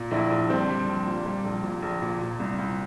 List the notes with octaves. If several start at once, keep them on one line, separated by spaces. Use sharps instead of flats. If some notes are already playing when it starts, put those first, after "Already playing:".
Already playing: A#2
A#1 D4 E4
A#1
G3 C4 D4
G3
A#1
A#2
G3
A#1
A#2
A#1
A#2
A#2
C2
C2